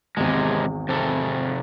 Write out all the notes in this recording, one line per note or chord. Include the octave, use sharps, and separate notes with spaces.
G#1 E2 C3 G#3
C3 A4